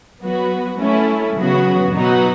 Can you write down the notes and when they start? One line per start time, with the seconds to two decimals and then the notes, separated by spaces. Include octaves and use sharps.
0.22 F#3 B3 F#4 B4
0.79 A3 C#4 E4 A4
1.36 C#3 F#3 B3 F#4
1.93 B2 F#3 B3 D#4 F#4